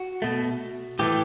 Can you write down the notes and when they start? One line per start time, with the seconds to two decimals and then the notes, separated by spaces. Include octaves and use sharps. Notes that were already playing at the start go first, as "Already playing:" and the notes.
Already playing: F#4
0.22 B2 A3
0.99 A2 E3 A3 G4